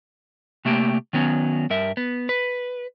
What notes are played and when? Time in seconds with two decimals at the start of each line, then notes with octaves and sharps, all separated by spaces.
0.65 C3 A3 A#3 G4
1.13 D#3 F#3 B3 C#4
1.70 G2 A#4 E5
1.97 B3
2.29 B4